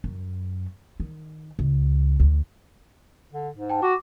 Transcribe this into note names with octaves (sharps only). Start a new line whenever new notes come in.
F#2
D#3
C#2
D2
D3
G#2
G5 A5
F#4 D6